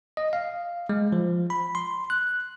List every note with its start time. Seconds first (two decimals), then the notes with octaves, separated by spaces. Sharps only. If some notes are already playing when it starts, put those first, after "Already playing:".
0.17 D#5
0.33 F5
0.89 G#3
1.12 F3
1.50 B5
1.75 C6
2.10 F#6